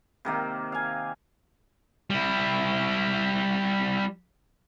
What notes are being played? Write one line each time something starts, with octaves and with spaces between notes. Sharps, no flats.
C3 D#3 A#3
F5 G#5
G3 E4